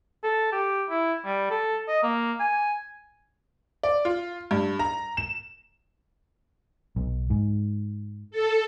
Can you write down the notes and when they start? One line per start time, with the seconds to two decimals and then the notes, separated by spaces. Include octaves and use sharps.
0.23 A4
0.52 G4
0.89 E4
1.25 G3
1.50 A4
1.88 D#5
2.03 A#3
2.40 G#5
3.83 D5
4.05 F4
4.51 G2
4.79 A#5
5.17 E7
6.96 B1
7.30 G#2
8.31 A4